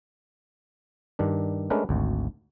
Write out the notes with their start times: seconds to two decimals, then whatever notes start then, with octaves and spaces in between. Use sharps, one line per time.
1.19 G2 D#3 D4
1.70 G#3 A3 C#4 D4 A#4 B4
1.89 G#1 D2